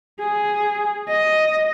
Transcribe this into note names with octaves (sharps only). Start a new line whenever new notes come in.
G#4
D#5